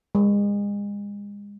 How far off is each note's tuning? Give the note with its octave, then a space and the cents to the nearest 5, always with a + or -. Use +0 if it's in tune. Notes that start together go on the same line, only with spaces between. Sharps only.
G#3 -35